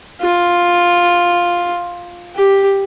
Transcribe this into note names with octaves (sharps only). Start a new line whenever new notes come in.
F4
G4